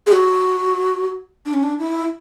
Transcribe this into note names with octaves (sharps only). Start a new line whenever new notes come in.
G#4
F#4
D4
C#4
D4
E4